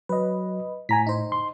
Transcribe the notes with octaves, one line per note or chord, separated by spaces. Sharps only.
F#3 B4 D#5
A2 G#5 A#5 B6
D#4 C5
C6